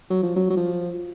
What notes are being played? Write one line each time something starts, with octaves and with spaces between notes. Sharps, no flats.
F#3
F3
F#3
F#3
F3